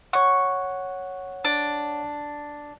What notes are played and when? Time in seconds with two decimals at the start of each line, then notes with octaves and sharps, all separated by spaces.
0.13 C#5 F#5 C#6
1.45 D4